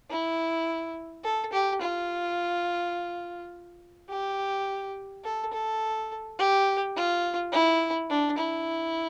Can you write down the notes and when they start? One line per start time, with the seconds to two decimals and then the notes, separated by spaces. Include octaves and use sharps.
0.10 E4
1.24 A4
1.53 G4
1.81 F4
4.09 G4
5.24 A4
5.53 A4
6.38 G4
6.96 F4
7.52 E4
8.10 D4
8.38 E4